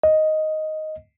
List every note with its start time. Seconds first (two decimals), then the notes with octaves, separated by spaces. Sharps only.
0.03 D#5